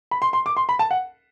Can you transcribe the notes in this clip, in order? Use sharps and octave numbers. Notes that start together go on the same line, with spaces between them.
B5
C6
C6
D6
C6
B5
A5
F#5